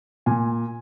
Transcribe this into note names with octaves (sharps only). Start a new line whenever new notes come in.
A#2 G#5